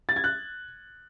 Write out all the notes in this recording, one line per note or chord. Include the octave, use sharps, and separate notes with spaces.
A6
G#6
F#6